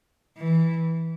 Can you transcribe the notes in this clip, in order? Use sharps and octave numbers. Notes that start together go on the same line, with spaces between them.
E3